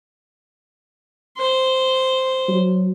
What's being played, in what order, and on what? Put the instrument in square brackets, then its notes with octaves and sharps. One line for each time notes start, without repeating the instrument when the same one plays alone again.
[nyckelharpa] C5
[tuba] F#3